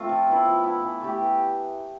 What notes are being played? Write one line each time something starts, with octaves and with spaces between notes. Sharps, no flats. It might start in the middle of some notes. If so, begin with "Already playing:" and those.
Already playing: A3 C4 F4
F3
B3 E4
F3
B3 E4
E3
A3 E4 G4
E3